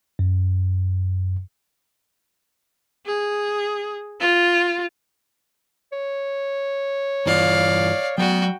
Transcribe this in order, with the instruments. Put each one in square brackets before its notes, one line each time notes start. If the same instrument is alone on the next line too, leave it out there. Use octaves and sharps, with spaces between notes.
[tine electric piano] F#2
[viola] G#4
F4
[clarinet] C#5
[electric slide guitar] G2 E3 F4 [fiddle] D5 F5
[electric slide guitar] F#3 D5 [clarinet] B3 [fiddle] F#4 G5